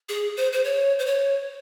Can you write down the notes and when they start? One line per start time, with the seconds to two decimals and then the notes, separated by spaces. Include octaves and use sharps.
0.09 G#4
0.37 C5
0.52 C5
0.64 C#5
0.99 C5
1.06 C#5